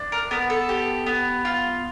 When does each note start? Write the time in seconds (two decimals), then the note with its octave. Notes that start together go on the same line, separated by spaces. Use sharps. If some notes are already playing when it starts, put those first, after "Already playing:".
Already playing: D4
0.12 A#4
0.31 B3 A#4
0.50 A4
0.69 G4
1.06 B3
1.45 F4